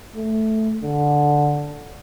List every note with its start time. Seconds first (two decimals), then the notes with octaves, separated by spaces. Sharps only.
0.16 A3
0.83 D3